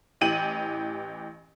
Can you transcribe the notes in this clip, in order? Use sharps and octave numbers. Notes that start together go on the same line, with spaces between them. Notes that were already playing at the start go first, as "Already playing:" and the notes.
A1 E3 G4 D#7 F#7